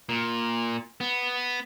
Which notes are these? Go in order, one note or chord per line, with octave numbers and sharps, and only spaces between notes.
A#2
B3